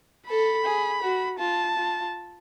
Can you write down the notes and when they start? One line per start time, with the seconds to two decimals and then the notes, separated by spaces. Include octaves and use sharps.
0.29 A4 B5
0.65 G#4
1.02 F#4
1.39 F4 A5
1.77 F4